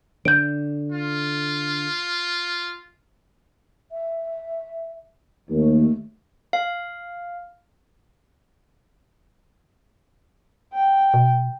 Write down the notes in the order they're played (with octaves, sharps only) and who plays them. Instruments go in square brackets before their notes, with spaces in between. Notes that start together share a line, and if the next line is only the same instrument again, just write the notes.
[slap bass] D3 [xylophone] G6 D7
[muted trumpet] F4
[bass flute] E5
[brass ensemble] D#2 [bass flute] A3
[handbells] F5
[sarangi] G5
[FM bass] B2